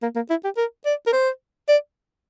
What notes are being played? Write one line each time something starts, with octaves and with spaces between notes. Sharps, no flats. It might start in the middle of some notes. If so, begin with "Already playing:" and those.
A#3
A#3
E4
G4
A#4
D5
A#4
C5
D5